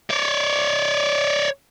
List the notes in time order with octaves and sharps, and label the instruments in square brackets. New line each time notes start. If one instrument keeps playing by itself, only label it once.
[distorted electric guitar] C#5 D5